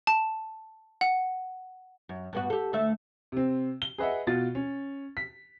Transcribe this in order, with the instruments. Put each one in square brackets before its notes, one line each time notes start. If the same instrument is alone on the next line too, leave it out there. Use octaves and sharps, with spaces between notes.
[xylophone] A5
F#5
[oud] F#2
G2 B3 F#4
G4 A4
D2 A3 E5
[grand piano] C3 C4
G7
G#4 B4 D#5 E5 F#5
B2 F4 F#4 A6
C#4
B6